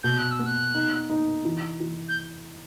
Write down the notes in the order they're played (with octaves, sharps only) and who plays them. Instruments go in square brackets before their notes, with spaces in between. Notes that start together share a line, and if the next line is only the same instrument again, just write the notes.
[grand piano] B2 [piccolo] G6
[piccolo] F#6
E6
[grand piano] B3
[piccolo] F#6
[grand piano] D#4
D#4
E3
E3
[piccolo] G6